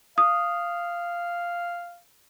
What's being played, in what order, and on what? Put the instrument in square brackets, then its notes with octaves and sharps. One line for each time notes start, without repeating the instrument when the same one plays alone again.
[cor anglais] F5 [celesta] D#6